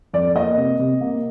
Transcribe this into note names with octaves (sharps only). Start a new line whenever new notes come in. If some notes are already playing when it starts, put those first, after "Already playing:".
F2 D5
A#3 D#5
C3
C3
A#3